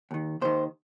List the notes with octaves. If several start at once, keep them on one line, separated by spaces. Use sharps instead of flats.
D#2 D#3
D#2 D#3 C5